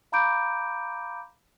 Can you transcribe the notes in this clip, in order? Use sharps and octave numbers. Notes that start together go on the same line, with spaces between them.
F5 A#5 B5 D6 G6 D7